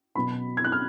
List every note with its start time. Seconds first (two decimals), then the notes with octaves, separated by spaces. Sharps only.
0.15 B2 F#3 B5
0.57 G#6
0.64 F#6
0.72 F6